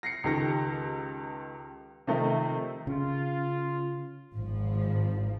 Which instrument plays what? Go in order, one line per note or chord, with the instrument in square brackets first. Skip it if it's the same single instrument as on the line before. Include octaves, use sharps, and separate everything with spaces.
[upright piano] A#6 C7 C#7
C#2 D#3 G4 A4 A#6
C3 D#3 F3 A3 D#4 A#4
[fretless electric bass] C#3 [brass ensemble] F4
[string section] G#1 F3